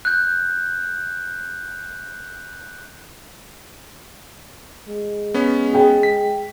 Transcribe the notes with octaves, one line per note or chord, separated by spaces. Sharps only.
F#6 G6
G#3
B3 C#4
G#4 G5
B6